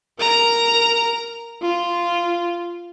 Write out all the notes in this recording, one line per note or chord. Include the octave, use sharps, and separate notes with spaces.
A#4 A#5
F4